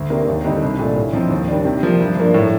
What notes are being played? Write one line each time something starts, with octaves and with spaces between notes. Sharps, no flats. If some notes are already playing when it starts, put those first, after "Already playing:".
Already playing: D2
C3 D#3 A#3 D4
D#2
D3 G3 C4 D#4
C2
A#2 A3 D4
A2
F3 C4 D#4
D#2
D#3 G3 D4
C3
F3 A#3 D4
G2
F3 A#3 D4
A2